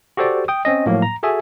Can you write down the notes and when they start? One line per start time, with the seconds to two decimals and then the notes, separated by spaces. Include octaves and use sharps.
0.17 F#4 G4 A4 C5 D5
0.48 G5 D#6
0.65 C4 C#4 D#5
0.86 A2 F3 F#3 A#3
1.02 A#5
1.23 F#4 G#4 A4 E5 G#5